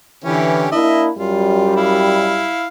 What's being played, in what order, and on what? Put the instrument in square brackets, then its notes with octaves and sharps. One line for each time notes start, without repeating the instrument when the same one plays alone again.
[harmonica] D3 C#4 G4 [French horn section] E3
[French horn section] A#3 D4 E4 [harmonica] D#5 E5
[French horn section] F#2 G3 [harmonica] F4
[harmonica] E4 F5